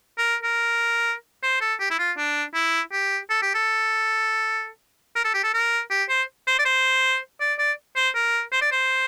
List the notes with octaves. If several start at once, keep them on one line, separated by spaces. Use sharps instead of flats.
A#4
A#4
C5
A4
G4
E4
F4
D4
E4
G4
A4
G4
A4
A#4
A4
G4
A4
A#4
G4
C5
C5
D5
C5
D5
D5
C5
A#4
C5
D5
C5